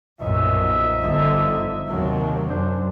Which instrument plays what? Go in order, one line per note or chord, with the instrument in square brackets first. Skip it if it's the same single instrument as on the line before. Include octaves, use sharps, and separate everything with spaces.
[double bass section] B1 F#2 A#2 [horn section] F3 D#4 E5
[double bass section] G1 D3
D#2 C3 F#3
[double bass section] F#2 [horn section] D4 C5